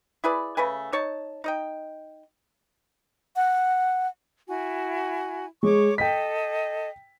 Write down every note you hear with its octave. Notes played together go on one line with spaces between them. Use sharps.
E4 G#4 B4 D5
C#3 A3 B4 G#5
D#4 C#5 A5
D#4 D#5 G5
F#5
E4 F#4 G#5
G#3 C#5 C#6 D6
A4 D#5 G5 B6